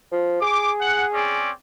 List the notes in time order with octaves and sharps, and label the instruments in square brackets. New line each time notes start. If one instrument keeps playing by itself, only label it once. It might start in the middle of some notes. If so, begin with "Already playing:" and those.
[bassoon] F3
[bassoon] G#4 [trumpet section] D6
[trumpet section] F#5
C4 C#4 D5